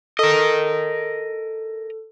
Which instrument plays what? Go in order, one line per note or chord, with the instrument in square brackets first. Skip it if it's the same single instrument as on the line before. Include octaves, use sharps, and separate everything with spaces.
[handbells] A4 [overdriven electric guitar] A#4 D#5